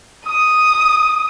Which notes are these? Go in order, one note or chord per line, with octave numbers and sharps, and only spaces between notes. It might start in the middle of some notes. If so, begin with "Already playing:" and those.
D#6